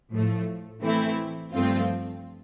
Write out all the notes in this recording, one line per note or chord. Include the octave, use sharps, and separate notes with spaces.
A2 F3 A3
E3 A3 C4 E4
G2 F3 A3 C4 F4